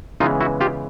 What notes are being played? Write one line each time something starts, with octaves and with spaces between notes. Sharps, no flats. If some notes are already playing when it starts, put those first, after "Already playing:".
C#3 E3 G#3 B3 D#4 F4
E4 F#4
F4 G4